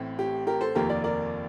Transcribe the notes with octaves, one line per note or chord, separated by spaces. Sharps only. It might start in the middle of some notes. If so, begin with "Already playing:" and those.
Already playing: A1 A2 A3 C4
G4
G4 A#4
A4 C5
F1 D#2 D#3 A#3 G4 A#4
A#4 D5
A#4 D5